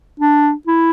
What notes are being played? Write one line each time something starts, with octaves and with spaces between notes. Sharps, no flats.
D4
E4